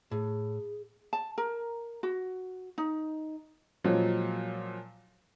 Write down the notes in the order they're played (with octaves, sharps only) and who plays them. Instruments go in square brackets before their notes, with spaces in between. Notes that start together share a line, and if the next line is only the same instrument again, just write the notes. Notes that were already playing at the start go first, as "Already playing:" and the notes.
[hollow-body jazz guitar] A2 [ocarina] G#4
[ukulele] A5
A#4
F#4
D#4
[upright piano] A#2 F3 F#3 G#3